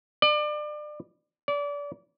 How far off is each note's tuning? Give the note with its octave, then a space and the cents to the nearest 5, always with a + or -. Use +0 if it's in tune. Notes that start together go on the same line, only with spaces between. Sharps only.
D5 +30
D5 -30